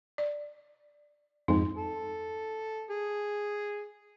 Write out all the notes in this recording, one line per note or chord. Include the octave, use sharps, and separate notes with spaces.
D5
F2 G#2 D#4
A4
G#4